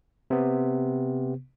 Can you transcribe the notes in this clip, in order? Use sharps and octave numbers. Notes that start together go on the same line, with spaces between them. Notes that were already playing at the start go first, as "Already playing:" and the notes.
C3 B3